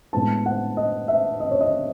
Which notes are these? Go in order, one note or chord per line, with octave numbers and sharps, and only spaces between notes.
A2 G#3 B3 A5
F#5
D#5
E5
D#5
C#5
D#5